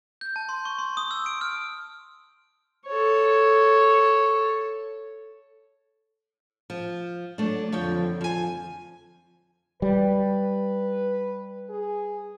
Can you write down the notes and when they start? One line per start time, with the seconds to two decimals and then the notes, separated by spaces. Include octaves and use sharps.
0.21 G6
0.36 A5
0.49 C6
0.65 C#6
0.79 C6
0.97 D#6
1.11 E6
1.26 D7
1.41 F6
2.87 A4 C#5
6.70 F3
7.38 F#3 A3 D4 D5
7.72 F2 D3 F3 C#5 G5
8.21 F3 G#5
9.82 G3 B4
11.69 G#4